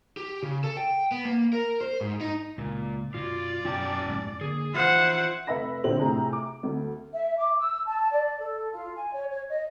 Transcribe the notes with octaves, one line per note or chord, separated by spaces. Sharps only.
G4
C#3
A4
G5
B3
A#3
A#4
C5
G#2
D#4
C#2 A#2 A#3
F#2 B2 F4 D5
F#2 B2 F#3 C#4 G5 A5
F2 G#2 B2
D3 A#3 G#4
E3 F3 F4 C5 E5 F#5
F1 B4 E5 B5 A#6
A#1 D3 C4 C5 F#7
A2 C3 G#4 A#5
D6
D2
E5
D6
E6
A5
D5
A4
F4
G#5
C#5
C#5
D#5